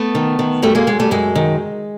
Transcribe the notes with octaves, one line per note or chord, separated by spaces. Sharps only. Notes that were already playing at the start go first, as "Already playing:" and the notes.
Already playing: A3 B3
D#3
D#3
F#2 G3 A3
G#3 A#3
F#2 G#3
G3 A3
F#2 G#3
D#3